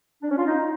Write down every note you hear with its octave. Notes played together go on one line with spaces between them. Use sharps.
D4
C#4
F4
D#4